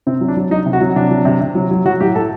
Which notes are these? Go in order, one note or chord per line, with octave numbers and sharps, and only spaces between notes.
C3 C4
F#3
D4
F#3
F#3 D#4
C3
F#4
F#3
C3 D4
F#3
C3
C3
F#3
F#3
F#3 F#4
A2 G4
A2 A4